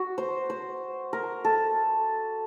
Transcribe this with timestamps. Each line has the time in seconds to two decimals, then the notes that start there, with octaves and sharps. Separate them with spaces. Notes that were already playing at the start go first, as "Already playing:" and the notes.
Already playing: F#4
0.18 C5
0.50 C5
1.13 A#4
1.45 A4